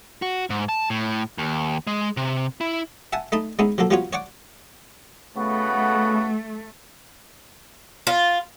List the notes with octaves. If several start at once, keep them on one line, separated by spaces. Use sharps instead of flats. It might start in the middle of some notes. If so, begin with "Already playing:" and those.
F#4
G#2
A5
A2
D#2
G#3
C3
E4
E5 F#5 G#5 A5
A3 D#4 D#5 A5 B5
G#3 B3 C#4 D#4 E4
F3 F#3 A#3 A4
F3 G3 B3 F4 F#4 C#5
C#5 D5 F#5 C#6 D6
C#3 A3 B3 F#4
F4